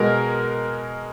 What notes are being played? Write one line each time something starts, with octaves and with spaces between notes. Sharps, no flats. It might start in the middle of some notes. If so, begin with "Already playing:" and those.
Already playing: B2 G#3 A#4